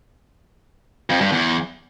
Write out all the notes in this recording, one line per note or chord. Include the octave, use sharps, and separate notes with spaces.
F2
G2
E2